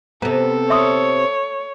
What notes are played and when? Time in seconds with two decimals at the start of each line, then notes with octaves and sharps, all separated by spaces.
0.22 C3 B3 A4 A#5
0.70 C#5 E5 C6 D#6